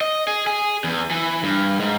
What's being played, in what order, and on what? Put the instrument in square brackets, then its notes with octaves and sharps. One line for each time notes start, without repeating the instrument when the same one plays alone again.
[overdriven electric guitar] D#5
G#4
G#4
E2
E3
G2
G#2